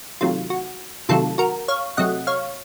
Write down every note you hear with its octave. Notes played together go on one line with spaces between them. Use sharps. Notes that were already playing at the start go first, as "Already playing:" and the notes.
C3 D#3 F#3 A3 F4
F#4
C3 D#3 F#3 A3 F4 A4
F#4 A#4
C#5 F5
C3 F#3 A3 D#5 F#5
C#5 F5